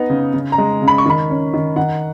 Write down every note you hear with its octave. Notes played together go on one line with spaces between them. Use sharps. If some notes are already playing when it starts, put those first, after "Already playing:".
Already playing: B3 D#4
C#3
C#3
A#5
G#3
C#3
B5
C#6
D#3 B5
C#4
D#3
D#3 F#5